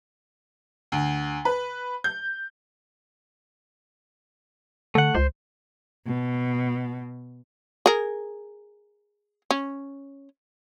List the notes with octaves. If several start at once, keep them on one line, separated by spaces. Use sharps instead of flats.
D2
B4
G6
D3 A3 F#5
C#2 C5
B2
G#4 A#4
C#4